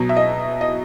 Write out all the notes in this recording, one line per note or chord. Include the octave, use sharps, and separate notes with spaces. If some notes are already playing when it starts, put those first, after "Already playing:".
Already playing: B2 F#3
E5
D#5
D#5